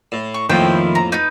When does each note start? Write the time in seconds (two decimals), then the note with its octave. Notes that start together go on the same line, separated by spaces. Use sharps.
0.12 A2
0.34 C#6
0.50 F2 A2 D#3 F3 A#3 E4 G5
0.95 A#5
1.12 D#4 B4 G6